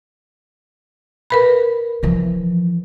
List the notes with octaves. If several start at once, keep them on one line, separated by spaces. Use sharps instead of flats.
A#4 B4 B5
E3 F3